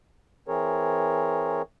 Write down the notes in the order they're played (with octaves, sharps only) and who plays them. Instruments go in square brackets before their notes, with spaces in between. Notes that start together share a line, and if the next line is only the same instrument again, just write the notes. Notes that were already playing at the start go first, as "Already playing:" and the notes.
[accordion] E3 C4 G#4 A#4 C#5